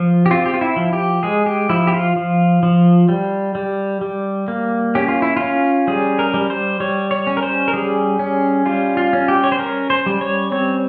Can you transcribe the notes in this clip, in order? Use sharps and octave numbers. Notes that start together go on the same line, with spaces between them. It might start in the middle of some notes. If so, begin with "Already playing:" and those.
Already playing: F3 F4
G4
C4 F4
G4
F4
E4
F3
G4
G#3 G#4
G4
F3 E4
G4
F4
F3
F3
G3
G3
G3
A#3
C#4 G4
F4
E4
C#4 F4
G3 G#4
A#4
G3
C5
G3 C#5
C#5
C#4
A#4
C5
A#4
G3 G#4
C#4
G3 F4
F4
C#4
G4
C#5
C5
C#4 A#4
C5
G3
C#5
C4 C#5